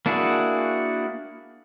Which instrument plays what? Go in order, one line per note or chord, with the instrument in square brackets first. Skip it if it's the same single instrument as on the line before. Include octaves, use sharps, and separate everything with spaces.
[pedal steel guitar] A#3 D4 E4 F#4 G#4